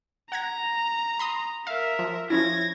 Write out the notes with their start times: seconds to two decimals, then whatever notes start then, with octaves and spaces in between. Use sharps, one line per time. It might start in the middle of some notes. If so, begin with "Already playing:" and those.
0.32 F#5 A#5 G#6 A#6
1.19 B5 C6 D#6
1.67 A#4 E5 F5
1.99 F3
2.30 F3 C#4 E4 G#6 A#6